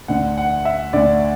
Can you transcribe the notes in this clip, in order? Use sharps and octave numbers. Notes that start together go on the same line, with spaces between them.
D2 D3 F#5
F#5
E5
D2 D3 D5